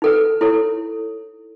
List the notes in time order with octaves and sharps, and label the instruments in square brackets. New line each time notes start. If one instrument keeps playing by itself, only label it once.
[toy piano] D#4 A4 B4
E4 A4 C#5